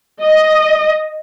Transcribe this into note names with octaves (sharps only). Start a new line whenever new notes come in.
D#5